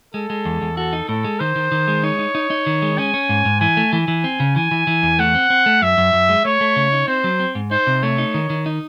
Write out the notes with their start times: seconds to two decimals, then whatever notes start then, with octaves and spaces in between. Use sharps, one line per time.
0.14 G#3 A4
0.30 G#3
0.45 E2
0.62 E2
0.77 F#4 A4
0.93 D#4
1.09 A2 A4
1.24 G#3
1.40 D#3 C5
1.56 D#3
1.72 D#3
1.88 G#3
2.04 D#4 C#5
2.19 D#4
2.35 D#4
2.50 D#4
2.66 D#3
2.82 G#3
2.98 C#4 G#5
3.14 C#4
3.29 G#2
3.45 G#2
3.60 E3 G#5
3.77 A3
3.93 E3 G#5
4.08 E3
4.24 C4
4.40 C#3
4.55 E3 G#5
4.71 E3
4.87 E3
5.03 E2
5.19 A3 F#5
5.35 C4
5.50 C4
5.66 A3
5.82 F#2 E5
5.98 F#2
6.13 F#2
6.29 G#3
6.45 A3 C#5
6.61 A3
6.76 C#3
6.92 D#4
7.08 C4 C5
7.24 F#3
7.39 C4
7.55 G#2
7.71 D#4 C5
7.87 C3
8.03 A3 C#5
8.18 D#4
8.34 D#3
8.50 D#3
8.66 D#4